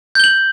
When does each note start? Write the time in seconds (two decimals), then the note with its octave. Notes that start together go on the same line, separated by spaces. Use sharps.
0.15 G6
0.20 G7
0.24 F#7